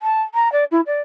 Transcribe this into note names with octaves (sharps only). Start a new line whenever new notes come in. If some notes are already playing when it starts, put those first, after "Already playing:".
A5
A#5
D5
E4
D5